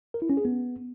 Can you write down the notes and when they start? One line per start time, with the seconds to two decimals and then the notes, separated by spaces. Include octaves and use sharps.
0.14 A#4
0.22 E4
0.30 C#4
0.37 G#4
0.45 B3